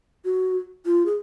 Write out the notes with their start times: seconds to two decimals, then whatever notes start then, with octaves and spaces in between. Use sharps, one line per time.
0.25 F#4
0.86 F4
1.06 G#4